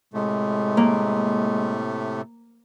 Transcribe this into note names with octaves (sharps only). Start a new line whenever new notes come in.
A2 C3 G#3 A3
A#3